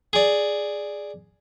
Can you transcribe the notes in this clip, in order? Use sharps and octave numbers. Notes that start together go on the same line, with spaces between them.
G#4 D5